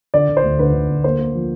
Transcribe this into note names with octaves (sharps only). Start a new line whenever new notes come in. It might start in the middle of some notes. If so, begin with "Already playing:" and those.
D3 D5
D3
C5
D2
D3 B4
D3
D2
A#3 C5
A#3
F3